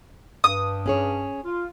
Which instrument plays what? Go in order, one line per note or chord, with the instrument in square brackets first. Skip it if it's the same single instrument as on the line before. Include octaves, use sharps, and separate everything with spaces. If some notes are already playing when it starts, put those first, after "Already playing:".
[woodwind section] G2 [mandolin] D#6
[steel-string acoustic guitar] C#4 G#4 C#5
[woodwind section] F4